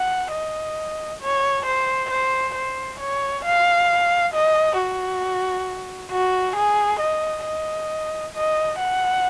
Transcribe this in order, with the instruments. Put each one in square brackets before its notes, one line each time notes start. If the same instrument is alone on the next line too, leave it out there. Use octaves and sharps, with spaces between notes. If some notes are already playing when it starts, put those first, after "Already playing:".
Already playing: [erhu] F#5
D#5
C#5
C5
C5
C5
C#5
F5
D#5
F#4
F#4
G#4
D#5
D#5
D#5
F#5